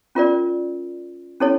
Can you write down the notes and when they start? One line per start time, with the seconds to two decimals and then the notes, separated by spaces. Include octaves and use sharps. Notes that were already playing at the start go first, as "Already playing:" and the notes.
0.15 C#4 F4 A#4 D5
1.40 C#4 E4 A4 C#5